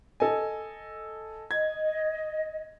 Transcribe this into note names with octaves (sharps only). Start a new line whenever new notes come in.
A4 D#5 G#5
D#5 G#6